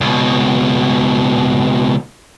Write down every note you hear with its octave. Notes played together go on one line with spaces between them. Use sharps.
C#2 B2